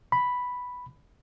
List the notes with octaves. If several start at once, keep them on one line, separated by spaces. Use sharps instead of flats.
B5